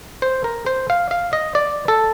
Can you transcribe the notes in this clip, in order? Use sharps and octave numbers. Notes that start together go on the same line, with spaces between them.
C5
A#4
C5
F5
F5
D#5
D5
A4